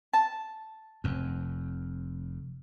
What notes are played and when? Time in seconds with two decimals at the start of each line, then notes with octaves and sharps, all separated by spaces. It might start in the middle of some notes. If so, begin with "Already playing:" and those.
0.13 A5
1.04 F1 F2